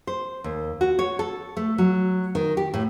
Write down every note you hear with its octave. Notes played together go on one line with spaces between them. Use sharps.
C5
D#2
F#4
C#5
A4
A3
F#3
D#3
G4
A2